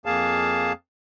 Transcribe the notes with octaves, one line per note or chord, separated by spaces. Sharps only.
F2 A#3 G#4 F5 A5